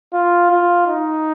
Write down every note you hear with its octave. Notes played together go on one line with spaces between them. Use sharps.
F4
F4
D#4